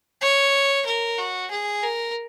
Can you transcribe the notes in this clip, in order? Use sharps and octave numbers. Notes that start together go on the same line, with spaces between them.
C#5
A#4
F#4
G#4
A#4